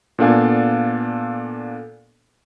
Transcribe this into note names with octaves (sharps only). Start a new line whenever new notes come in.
A#2 B3 D4 A4 F5 G#5